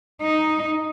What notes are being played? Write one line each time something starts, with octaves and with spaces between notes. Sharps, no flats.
D#4